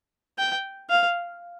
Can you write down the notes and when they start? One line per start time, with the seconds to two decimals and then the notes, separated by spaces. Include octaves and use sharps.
0.39 G5
0.90 F5